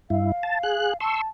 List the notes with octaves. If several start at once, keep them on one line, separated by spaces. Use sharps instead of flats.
G2 E4 F5
A5
G#4 F#6
A5 C6 C#6 E6